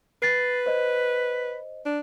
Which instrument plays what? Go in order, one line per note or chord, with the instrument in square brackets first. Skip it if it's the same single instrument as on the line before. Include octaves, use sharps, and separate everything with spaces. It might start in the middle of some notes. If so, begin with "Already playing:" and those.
[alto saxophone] B4 [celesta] A6 C7
[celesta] C5 D#5
[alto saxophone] D4